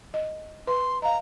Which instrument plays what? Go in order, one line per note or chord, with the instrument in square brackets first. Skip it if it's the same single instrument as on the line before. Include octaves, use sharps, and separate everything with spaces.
[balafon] D#5
[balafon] B4 [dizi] C6
[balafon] D#5 F5 [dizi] A#5